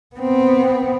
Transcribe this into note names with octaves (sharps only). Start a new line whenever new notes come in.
B3 C4